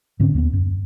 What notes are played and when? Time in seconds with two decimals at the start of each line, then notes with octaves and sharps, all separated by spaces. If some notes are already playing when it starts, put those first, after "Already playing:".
0.20 G#2 D3 C4 C#4
0.34 D#2 G3 B3
0.53 F#2